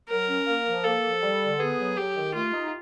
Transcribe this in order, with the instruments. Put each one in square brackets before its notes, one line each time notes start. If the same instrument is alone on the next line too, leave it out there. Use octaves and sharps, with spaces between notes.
[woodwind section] F#3 [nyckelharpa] A#4
[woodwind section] C#4
A#3
F3
[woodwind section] A#3 [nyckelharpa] A4
[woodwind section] F3
G3
D3
[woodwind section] B3 [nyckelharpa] G#4
[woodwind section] F#3
[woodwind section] F#3 [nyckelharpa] G4
[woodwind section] D#3
[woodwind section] A3 [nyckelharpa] F4
[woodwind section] D#4